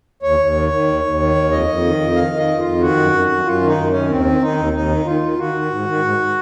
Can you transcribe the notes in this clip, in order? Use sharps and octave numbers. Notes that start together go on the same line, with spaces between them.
D#2 C#5
D#2
D#3
D#3
D#2
D#2
D#3
D#2
F2 D#5
F2
D#3
F2
D#3 F5
D#3 D#5
F2
F4
F2
D#3 F#4
F#2
F#2
F#2
F#2 F4
D#3 D#4
F#2
C#4
D#3
D#2 C4
D#3
D#3 D#4
D#2
D#2 D#4
D#3
D#3 F4
D#3
D#3 F#4
D#3
G#2
D#3
G#2